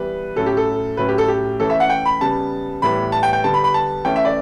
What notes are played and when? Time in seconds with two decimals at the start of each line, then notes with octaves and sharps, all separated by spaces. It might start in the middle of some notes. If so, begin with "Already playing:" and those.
Already playing: E3 G3 B3 B4
0.36 A2 F#3 C#4 A4
0.46 G4
0.57 A4
0.97 A2 F#3 C#4 B4
1.08 G4
1.18 A4
1.28 G4
1.60 E3 A3 C#4 A4
1.70 E5
1.80 F#5
1.90 G5
2.05 B5
2.20 C#3 G3 B3 A5
2.82 A2 E3 G3 B3 B5
3.12 A5
3.23 G5
3.33 G5
3.44 D3 G3 B3 A5
3.54 B5
3.64 B5
3.74 A5
4.05 E3 A3 C#4 G5
4.16 E5
4.25 D5